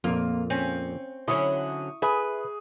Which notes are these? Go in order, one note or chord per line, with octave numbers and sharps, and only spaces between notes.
F2 A#2 A#3 F4
C4 C#4
D3 F#3 C#4 E4 C#6 D#6
G#4 B4 E5